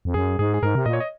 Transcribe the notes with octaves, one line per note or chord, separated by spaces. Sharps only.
F2
F#2 G#4
G#2 G#4
G#4
G#2 A#4
C3
A#2 D#5
C#5
D#5